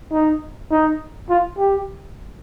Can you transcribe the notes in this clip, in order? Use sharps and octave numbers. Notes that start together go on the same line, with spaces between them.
D#4
D#4
F4
G4